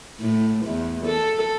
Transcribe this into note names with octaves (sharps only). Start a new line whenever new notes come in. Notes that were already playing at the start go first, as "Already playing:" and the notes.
A2
E2
A4